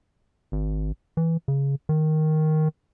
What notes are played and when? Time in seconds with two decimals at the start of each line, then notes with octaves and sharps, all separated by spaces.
0.52 G#1
1.17 E3
1.48 C#3
1.89 D#3